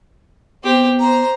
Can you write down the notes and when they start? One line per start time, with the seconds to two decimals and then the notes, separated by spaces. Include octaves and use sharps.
0.64 B3 C4 G4
1.00 C5 A#5